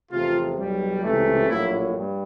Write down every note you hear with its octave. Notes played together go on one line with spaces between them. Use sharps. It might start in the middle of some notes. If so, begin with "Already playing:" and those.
E2 C3 F3 A3 F4
B1 B2 G3
C#2 C3 E3 A3
A#1 A2 F#3 A#3 E4
G2